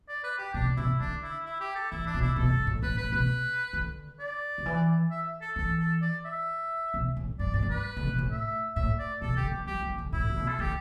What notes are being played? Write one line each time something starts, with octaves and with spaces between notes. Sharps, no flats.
D5
B4
G4
B2 D4
B2 E4
D3 D4
E4
E4
G4
A4
E3 E4
D4
B2
E4
B2 A4
G2
A2
A2 B4
A2 B4
B2 B4
D3
D5
D3
E3
E5
A4
E3 A4
A4
D5
E5
B2
A2
G2 D5
A2 D5
G2
B4
D3
B2
A2
E5
A2 E5
D5
B2 A4
D3 G4
E3
G3 G4
E3
D3
A2 E4
D3
B2
A4
D3 G4